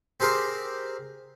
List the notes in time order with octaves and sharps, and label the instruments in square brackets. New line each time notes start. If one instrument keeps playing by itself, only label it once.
[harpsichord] C4 G4 G#4 A#4 C5